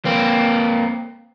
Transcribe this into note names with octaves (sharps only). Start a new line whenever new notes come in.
A#3 C4